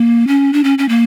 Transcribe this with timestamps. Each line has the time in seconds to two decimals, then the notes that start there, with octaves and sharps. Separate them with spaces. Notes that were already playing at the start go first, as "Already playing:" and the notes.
Already playing: A#3
0.27 C#4
0.53 D4
0.64 C#4
0.78 C#4
0.89 A#3